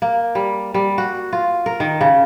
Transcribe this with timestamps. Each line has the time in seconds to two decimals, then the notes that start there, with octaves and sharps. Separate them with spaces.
0.02 A#3
0.35 G3
0.74 G3
0.98 F#4
1.33 F4
1.66 A#4
1.80 D#3
2.01 C#3